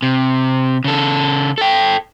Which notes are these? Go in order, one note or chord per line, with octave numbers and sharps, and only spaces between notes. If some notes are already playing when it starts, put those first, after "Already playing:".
C3
C#3 A4
A4 G5